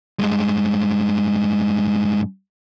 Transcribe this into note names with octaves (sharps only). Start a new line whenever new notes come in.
G2 G#3